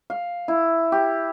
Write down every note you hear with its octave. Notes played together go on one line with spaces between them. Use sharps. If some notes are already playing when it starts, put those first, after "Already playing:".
F5
E4
G4